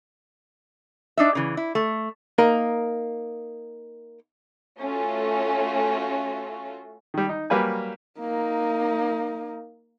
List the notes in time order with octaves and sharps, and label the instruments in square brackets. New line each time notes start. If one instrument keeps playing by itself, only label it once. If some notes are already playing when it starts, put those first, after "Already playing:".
[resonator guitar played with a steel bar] D4 D#4 E5
C#3 E3
E4
A3
[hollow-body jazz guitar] A#3 D#4 A#4
[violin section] A3 C#4 F4 F#4 A4
[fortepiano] D#3 G3
D#4
F#3 G3 A#3 B4 G#5
[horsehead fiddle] A#3 D#4